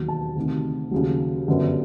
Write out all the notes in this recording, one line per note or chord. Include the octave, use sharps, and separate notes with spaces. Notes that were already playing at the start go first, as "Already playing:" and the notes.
Already playing: E1 D#2 D#3 F#3
A5
D2 C3 D#3
D#2 C#3 F#3
G1 F#2 D3 G3